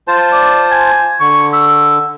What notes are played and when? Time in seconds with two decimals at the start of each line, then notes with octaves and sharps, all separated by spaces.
0.08 F4 C5 A5
0.32 D5
0.71 G#5
1.20 D3 C#6
1.53 E6